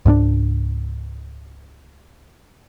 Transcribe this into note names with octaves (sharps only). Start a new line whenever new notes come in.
C#2 G#2 C#4 D4